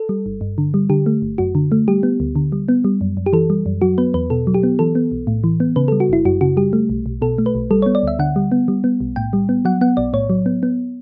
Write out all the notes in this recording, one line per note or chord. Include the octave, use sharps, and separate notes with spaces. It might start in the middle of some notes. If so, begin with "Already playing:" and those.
Already playing: A4
G3
G1
G2
D3
G3
D3 G4
A3
G1
F#2 F#4
D3
A3
G3 G4
B3
D2
D3
G3
B3
G3
F#2
F#2
G4
E3 A4
G3
F#2
F#3 F#4
B3 B4
E2 B4
B2 A4
F#3
G4
B3
E3 A4
B3
B1
A2
E3
B3
C#3 B4
G3 A4
F#4
G1 E4
F#2 F#4
C#3 F#4
G3 G4
A3
B1
B1
B2 A4
A3
B4
B1
G3 A4
B3 C#5
D5
D2 E5
D3 F#5
G3
B3
G3
B3
B1
A2 G5
G3
B3
F#3 F#5
B3 F#5
B1 D5
A2 C#5
F#3
B3
B3